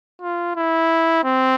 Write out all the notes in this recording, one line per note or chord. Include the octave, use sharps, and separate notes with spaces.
F4
E4
C4